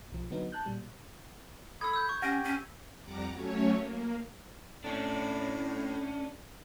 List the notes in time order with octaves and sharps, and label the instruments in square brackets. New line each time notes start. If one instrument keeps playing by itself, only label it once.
[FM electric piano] B1 F3
D3 F#3 B3 D#4
A5 F#6 G6
A#2 G3
[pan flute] A4 [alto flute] B5 [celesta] D#6 [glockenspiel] E6 G#6
[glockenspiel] E6 G6
C#6
[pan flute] C#4 [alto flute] G4 [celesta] F#5 A#6 D7
[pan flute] C#4
[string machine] F2 G3 F#5 A#5 D6
F#3 A3 C#4 C#5
A#3
[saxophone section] A2 [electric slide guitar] C#4 D4